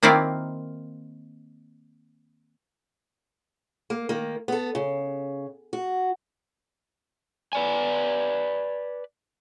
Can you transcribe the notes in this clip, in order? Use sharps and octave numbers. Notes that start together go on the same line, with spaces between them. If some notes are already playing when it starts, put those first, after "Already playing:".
D#3 A#3 C4 E4 F4 D5
A#3
D#3 A#3
B3 A4
C#3
F#4
B4 D5 G#5